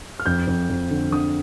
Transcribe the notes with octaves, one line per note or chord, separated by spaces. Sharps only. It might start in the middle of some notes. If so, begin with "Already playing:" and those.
F6
F2 G6
F2
F2
D3
D3 D#6